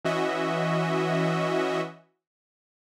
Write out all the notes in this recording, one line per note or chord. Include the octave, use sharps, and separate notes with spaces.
E3 C#4 F#4 D#5 E5